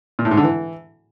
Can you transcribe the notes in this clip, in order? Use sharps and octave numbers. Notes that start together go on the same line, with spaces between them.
A#2
A2
G#2
D3
E3